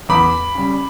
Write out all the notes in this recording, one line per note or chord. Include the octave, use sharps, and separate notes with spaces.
E2 B5 D6
C#3 G3